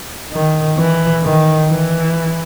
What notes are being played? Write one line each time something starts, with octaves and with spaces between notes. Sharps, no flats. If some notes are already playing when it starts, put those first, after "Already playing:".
D#3
E3
D#3
E3